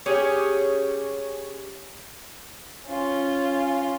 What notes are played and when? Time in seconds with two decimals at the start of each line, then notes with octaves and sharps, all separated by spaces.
0.06 C#4 G4 G#4
2.87 C#4 F4